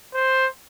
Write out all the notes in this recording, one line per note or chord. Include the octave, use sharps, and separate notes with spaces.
C5